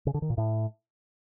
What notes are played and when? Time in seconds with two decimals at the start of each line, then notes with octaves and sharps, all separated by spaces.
0.07 C#3
0.14 D3
0.22 D#3
0.30 A#2
0.38 A2